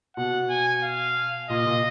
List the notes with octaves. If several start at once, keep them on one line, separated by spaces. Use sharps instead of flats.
B2 F#5
G#5
F5
A#2 D#5
A#2